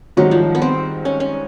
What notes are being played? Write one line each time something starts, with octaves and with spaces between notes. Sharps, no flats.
G#2 D#3 F#3 G3 C4 D#4
F3
B3
C4
C#4
C#4